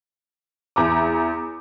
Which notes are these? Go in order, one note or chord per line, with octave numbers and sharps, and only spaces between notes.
E2 A#5 D6